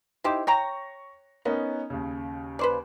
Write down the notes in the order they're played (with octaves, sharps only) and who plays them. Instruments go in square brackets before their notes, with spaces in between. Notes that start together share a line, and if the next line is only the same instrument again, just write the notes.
[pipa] D#4 G4 C5 [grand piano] E4
[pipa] C#5 G5 A#5 [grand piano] C#6 A#6
[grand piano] B3 C#4 D#4 [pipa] A#4
[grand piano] D#2 C#3
[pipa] B4 C5 D5